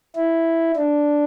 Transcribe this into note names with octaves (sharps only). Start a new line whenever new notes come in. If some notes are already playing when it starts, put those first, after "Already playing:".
E4
D4